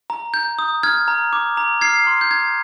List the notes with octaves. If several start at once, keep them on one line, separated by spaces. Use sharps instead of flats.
A#5
G6
D#6
F6 G#6
A#5
D6
A#5
F6 G#6 C7
C6
G6
A#5 G#6